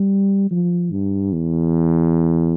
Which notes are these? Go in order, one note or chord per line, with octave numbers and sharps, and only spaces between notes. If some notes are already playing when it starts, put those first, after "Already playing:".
Already playing: G3
F3
G2
E2